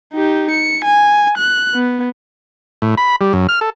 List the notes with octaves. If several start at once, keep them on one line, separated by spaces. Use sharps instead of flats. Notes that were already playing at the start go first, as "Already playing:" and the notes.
D#4 G4
C#7
G#5
F#6
B3
A2
B5
G3
F#2
F6
A4